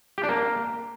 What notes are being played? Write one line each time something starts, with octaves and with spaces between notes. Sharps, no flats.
G4
D4
A#3